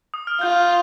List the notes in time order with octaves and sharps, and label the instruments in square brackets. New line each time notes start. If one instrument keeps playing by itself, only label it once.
[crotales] D#6
F6
[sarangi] F4 [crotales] G6